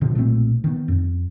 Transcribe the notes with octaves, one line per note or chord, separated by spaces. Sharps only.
B2 D3 F3
B1 A#2 A3 C4
D#3 B3
F2